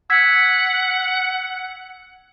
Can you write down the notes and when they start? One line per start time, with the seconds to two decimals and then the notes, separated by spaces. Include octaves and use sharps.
0.10 F#5 E6 G#6 B6